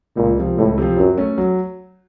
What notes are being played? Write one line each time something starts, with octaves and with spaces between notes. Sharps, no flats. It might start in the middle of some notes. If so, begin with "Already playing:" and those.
C#2 A#2
C3 F3
C#2 A2
C3 F3
F#2 F#3
A3 C#4
F#3